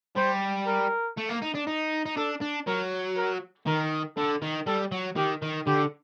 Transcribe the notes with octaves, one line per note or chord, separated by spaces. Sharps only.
G3 C5
A#4
A3
A#3
D#4
D4
D#4
D#4
D4 A4
D4
F#3 A#4
A#4
D#3 A#4
D3 A4
D#3
G3 A4
F#3
D#3 G4
D#3
D3 G4